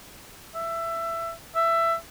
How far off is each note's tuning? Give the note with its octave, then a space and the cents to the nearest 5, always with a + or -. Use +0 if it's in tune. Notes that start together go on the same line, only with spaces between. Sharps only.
E5 +20
E5 +15